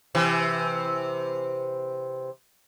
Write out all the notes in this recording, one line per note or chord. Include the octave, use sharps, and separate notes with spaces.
C3 E3